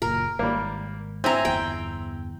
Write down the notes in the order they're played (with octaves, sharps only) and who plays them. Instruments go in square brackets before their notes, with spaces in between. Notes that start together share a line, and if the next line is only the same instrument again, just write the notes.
[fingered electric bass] F#1 A#2 [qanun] A#4
[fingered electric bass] G#1 [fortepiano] G3 A#3
[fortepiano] C4 E4 [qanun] G#5 A#5
[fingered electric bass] G1 E2 [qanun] G5